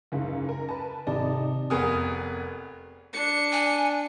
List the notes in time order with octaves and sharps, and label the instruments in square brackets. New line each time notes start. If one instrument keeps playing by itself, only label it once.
[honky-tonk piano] F#1 C#2 G#2
A#4
B4 A5
[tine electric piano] G#1 C3 D5 [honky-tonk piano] D#4 A5
[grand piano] F1 B3 G#4 A#4 D#6
[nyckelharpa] D4 [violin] C#7
[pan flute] G#5